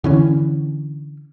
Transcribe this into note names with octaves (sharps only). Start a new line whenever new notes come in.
D3 E3 C#4